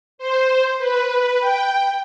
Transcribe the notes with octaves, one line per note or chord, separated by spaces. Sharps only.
C5
B4
G5